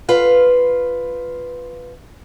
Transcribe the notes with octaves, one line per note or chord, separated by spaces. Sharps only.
F4 B4 F5